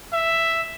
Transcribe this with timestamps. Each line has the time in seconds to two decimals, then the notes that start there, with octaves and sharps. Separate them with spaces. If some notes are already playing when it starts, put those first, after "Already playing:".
0.13 E5